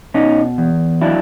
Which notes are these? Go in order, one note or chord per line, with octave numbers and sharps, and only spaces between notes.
B2 C#4 D#4
E2
F#3 D4 E4